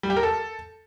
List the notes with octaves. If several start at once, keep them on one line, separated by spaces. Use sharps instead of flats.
G3
G4
A#4
A4